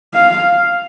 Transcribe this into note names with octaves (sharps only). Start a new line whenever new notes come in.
F5